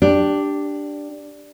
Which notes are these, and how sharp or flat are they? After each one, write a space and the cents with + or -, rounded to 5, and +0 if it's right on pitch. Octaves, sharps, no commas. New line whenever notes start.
D4 +0 G4 +0